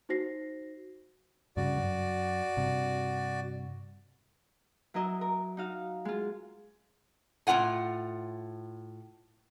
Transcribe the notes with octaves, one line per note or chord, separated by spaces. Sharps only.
D#4 F#4 C5 A#6 C7
G2 C#3 F#4 D5
F#2
G2 C3
F#3 E4 A#4 D#5 E5
A#4
D#4 F#4 F5
G#3 F4
A2 D4 F4 F#5 G#5